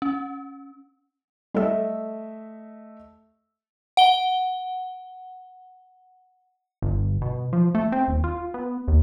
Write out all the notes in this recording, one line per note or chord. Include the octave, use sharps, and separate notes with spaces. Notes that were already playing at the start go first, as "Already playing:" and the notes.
C#4
G3 A3 A4 D#5 E5
F#5 G7
G1
B2
F3
A3
C4
D#1
F4
B3
D#2